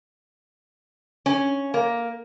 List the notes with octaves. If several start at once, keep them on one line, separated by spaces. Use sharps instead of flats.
C#4
A#3